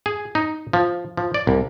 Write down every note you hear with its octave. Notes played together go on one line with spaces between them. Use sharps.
G#4
D#4
F3
F3
D5
C2